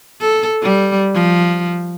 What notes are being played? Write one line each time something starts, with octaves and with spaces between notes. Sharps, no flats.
A4
G3
F3